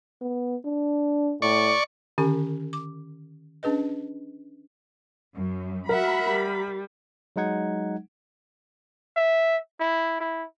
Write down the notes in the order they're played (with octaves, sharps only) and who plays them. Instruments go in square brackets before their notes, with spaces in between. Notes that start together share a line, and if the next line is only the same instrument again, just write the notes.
[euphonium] B3
D4
[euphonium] A2 [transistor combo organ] D5 C#6
[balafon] D3 D#3 C#4 G4 G#5 C#6
D6
C#4 D4 G#4 B4 D#5
[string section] F#2
[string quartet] F#4 E5 F#5 [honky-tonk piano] A#4 [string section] B5
[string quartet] G3
[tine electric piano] F#3 G#3 D#4 F#5 G#6
[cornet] E5
E4
E4